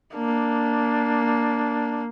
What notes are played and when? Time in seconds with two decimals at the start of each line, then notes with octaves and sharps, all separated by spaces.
0.15 A#3 D4